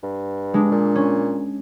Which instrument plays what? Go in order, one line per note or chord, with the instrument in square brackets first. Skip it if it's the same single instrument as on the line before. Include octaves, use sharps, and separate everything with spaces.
[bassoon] G2
[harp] G#3 D4
[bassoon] A#2
[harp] C#4